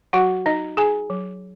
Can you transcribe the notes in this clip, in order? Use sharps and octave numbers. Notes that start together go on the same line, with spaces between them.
F#3 F#4 F#5
D#4 D#5
D#4 G#4 G#5
F#3